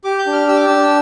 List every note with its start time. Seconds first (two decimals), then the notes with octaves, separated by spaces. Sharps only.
0.04 G4 D6
0.19 G6
0.26 D4
0.33 F6
0.47 G4 E6
0.56 D6
0.66 D4 E6